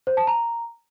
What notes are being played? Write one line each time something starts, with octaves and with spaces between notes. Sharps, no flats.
C5
A5
A#5